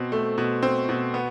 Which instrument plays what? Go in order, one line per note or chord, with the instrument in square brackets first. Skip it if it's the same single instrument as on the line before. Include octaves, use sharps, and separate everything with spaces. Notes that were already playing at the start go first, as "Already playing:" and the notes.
Already playing: [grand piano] B2 C4
A3
B2
C4
B2
B3